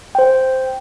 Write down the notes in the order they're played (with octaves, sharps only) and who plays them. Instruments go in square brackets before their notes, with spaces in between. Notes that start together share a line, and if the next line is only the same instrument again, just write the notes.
[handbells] C5 G5